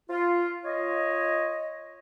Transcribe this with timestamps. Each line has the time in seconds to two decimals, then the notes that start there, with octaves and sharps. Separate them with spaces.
0.09 F4
0.65 F4 C#5 D#5